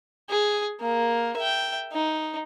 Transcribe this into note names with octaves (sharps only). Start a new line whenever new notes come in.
G#4
A#3
E5 G5
D#4